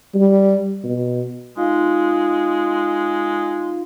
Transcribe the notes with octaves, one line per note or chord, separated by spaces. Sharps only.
G3
B2
G#3 D#4 F4 F5